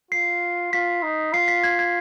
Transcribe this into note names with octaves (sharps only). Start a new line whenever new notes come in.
F4 C7
F4 B6
D#4
F4 C7
B6
G#6
G#6